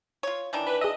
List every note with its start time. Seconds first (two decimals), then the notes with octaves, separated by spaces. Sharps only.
0.23 F4 C#5
0.53 D#3 E3 D4
0.66 B4
0.81 G#4 D#5 E5